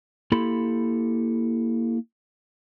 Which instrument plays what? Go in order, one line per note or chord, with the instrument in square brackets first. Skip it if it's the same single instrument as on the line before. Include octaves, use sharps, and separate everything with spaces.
[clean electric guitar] A#3 E4 G4 A4 B5 C6